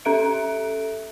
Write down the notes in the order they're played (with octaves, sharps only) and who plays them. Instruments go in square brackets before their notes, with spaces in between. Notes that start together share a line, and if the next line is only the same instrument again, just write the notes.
[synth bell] C#4 A4 E5 D7